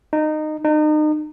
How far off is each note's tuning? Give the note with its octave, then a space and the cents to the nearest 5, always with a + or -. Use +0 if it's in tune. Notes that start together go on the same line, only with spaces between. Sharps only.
D#4 -20
D#4 -35